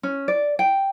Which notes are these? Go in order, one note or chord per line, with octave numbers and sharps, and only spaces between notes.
C#4
D5
G5